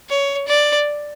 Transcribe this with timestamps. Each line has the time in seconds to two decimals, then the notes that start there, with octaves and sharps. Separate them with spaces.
0.09 C#5
0.48 D5